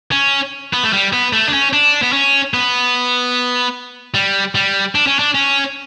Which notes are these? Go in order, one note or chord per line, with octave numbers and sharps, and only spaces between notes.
C#4
B3
A3
G3
B3
A3
D4
C#4
D4
B3
C#4
B3
G3
G3
D4
C#4
D4
C#4